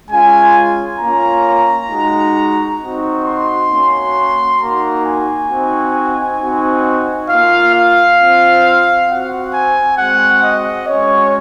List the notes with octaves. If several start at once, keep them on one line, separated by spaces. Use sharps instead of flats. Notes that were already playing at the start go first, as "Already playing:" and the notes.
G#3 C#4 F4 G#5
A#3 C#4 F4 A#5
G#3 D#4 F#4
C4 D#4 F#4
C6
A#3 C#4 F#4
A#3 D#4 F#4 A#5
G#5
C4 D#4 F#4
C4 D#4 F#4
A#3 F4 F5
F5
C4 F4
C4 F#4 F#5
G#5
G#3 C4 F#4 F#5
D#5
G#3 C#4 F#4 C#5